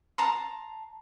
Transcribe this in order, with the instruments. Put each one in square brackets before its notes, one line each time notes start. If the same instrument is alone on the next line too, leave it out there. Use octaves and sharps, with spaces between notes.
[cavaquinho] A5 A#5 C6